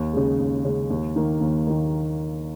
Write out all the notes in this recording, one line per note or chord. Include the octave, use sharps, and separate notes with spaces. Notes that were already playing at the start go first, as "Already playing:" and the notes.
Already playing: D#2
C#3 G#3
D#2
C#3 G#3
D#2
D#3 A#3
D#2
D#3 A#3